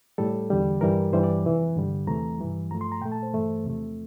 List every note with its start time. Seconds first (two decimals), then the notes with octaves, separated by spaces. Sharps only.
0.18 A2 G3 A4
0.50 E2 D3 G3
0.81 G2 E3 G3 A#4
1.13 G2 E3 G3 C5
1.23 D5
1.44 F2 C3 E3
1.76 G2 D3 G3
2.07 E2 C3 E3 A3 A#5
2.39 G2 E3 G3
2.70 G2 F3 A3 A#5
2.81 C6
2.92 A#5
3.01 A#2 G5
3.05 A3
3.12 A5
3.23 C5
3.33 G2 E3 A3
3.64 E2 C3 F3 A3